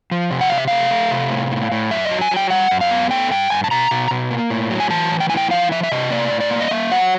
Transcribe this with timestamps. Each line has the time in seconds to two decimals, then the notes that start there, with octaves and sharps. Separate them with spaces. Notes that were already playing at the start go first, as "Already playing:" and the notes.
0.11 F3
0.31 C3
0.41 F#5
0.49 C3 F5
0.58 E5
0.68 A3 F5
0.91 A3
1.11 C3
1.31 A2
1.51 A2
1.72 A2
1.91 F#2 E5
2.05 D#5
2.11 F#3
2.21 G#5
2.31 F#3
2.37 G5
2.50 G3 F#5
2.71 F#2
2.81 F5
2.91 B3
3.11 A3 G5
3.31 G2 G5
3.50 G2 G#5
3.64 A5
3.71 B2 A#5
3.91 B2
4.11 B2
4.31 A#3
4.50 A2
4.71 F#3
4.80 G#5
4.90 E3 A5
5.10 A2
5.20 G5
5.30 E3 G#5
5.37 G5
5.50 F3 F5
5.71 F3 E5
5.83 E5
5.92 C3 D#5
6.11 A#3 D5
6.31 A2
6.40 D5
6.51 A#3
6.60 D#5
6.71 A#3 E5
6.92 F#3 F#5